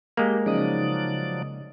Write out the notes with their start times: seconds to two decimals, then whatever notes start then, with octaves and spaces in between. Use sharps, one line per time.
0.17 G#3 A#3 G4
0.46 C#3 F3 F#3 D#4 D5 D#6